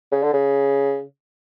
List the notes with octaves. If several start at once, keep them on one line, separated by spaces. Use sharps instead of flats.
C#3
D3
C#3